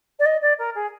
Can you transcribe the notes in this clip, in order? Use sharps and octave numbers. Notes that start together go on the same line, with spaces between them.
D5
D#5
D5
A#4
G#4